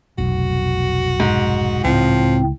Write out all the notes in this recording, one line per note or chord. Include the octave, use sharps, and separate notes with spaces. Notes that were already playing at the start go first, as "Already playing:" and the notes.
F1 B1 F#4
G#2
C#2 A2 F3 C4